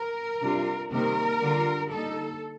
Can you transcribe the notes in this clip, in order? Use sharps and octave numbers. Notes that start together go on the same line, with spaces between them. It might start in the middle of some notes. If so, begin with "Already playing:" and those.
Already playing: A#4
C3 G3 D4 F4
C3 D#3 G3 A#3 A#4
D3 G3 D4 F4
D3 G3 A#3 D#4 A4